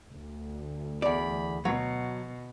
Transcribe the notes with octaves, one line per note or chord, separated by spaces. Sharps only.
D2
E2 D5 B5
B2 F#3